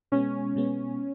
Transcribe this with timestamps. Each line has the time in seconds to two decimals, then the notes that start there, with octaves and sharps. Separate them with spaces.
0.12 B2 G#3 B3 C#4
0.56 B2 G#3 B3